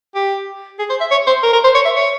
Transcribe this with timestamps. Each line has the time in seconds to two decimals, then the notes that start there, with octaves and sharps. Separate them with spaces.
0.15 G4
0.79 G#4
0.90 C5
1.00 E5
1.11 C#5
1.27 C5
1.43 A#4
1.53 A#4
1.64 C5
1.75 C#5
1.85 E5
1.96 C#5